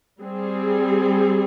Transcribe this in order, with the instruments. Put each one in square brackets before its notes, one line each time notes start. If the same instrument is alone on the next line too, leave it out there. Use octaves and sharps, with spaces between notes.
[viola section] G3 C4 G#4